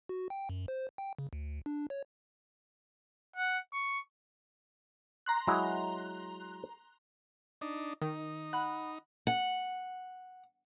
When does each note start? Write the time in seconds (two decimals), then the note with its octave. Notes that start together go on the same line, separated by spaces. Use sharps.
0.09 F#4
0.30 G5
0.50 F#2
0.68 C5
0.98 G5
1.19 C#3
1.33 D2
1.66 D4
1.90 C#5
3.36 F#5
3.73 C#6
5.26 A#5 C6 F#6
5.47 F#3 G#3 E4
7.61 D4 D#4
8.02 D#3 D#4
8.53 F#5 B5 F#6
9.27 F#5